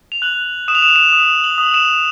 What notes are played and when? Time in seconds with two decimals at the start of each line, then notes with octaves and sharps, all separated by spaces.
0.12 F7
0.22 F#6 F#7
0.68 D#6 E7
0.75 F7
0.82 E7
0.89 F7
0.96 E7
1.13 D#6
1.44 F#7
1.58 D#6
1.74 E7